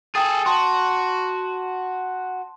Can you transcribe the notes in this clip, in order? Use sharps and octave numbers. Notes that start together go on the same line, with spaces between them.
G#4 A4 G5 D#6 A6
F#4 A5 C6